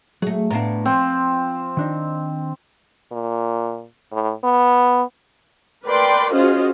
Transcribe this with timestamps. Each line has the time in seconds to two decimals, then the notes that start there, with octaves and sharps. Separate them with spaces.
0.22 F#3 A3 G#4
0.51 A2 B3 D4 F5 A5 A#5
0.86 F3 C4
1.77 D#3 D4 D#4
3.12 A#2
4.12 A2
4.44 B3
5.85 A#4 B4 D5 G5 C6
6.33 C#4 F4 F#4 G#4 C5 D#5